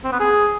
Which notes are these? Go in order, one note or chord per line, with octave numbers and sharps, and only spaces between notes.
C4
B3
G#4